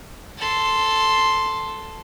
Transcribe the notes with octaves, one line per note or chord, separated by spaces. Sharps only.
A4 C6